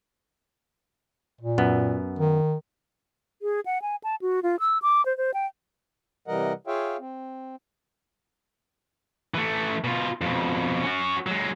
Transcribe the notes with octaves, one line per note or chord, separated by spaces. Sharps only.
A#2
F#2 B3
D#3
G#4
F#5
G#5
A5
F#4
F4
E6
D6
C5
C5
G5
C3 E3 G3 A#4 D#5 F#5
F4 G#4 C#5 E5 F5 G5
C4
E3 A3
B2 F4
F2 B2
C#4 F#4
F#3 G#3